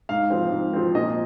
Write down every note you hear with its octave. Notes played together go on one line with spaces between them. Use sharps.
G#2 F5
F3 C4
G#2
F3 C4
A#2 D#5